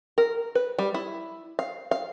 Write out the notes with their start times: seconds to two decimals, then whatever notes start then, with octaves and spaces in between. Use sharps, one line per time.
0.18 A#4
0.55 B4
0.78 G3
0.94 E4
1.59 F5
1.91 F5